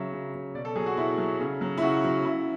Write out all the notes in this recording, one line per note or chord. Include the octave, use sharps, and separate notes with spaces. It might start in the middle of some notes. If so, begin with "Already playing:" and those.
Already playing: C#3 F#3 E5
C#3
F#3
B2 D5
A4
F#3 G#4
F#4
B2 E4
F#3
C#3
F#3
E4
C#3 F#4
F#3
C#3 E4